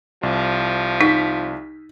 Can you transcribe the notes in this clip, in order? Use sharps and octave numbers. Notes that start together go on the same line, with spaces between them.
C2 F3
D#4 B6